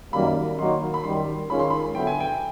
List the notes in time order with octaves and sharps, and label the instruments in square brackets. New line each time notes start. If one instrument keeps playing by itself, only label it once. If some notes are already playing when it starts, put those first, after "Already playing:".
[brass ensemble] F#2 D#3 G3 A#3 [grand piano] B5
[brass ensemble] D#3 F#3 A#3 D#4 F#4 [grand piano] C6
[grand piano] B5
[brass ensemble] F#2 D#3 G3 [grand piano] C6
[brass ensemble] D#3 G#3 C#4 F4 G#4 [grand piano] B5
[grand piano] C6
B5
[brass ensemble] D3 F#3 B3 E4 [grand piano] G5
[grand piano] G#5
G5